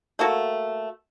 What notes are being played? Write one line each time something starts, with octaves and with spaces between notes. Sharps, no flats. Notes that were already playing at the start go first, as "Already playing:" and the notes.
A3 A#3 F#4 A4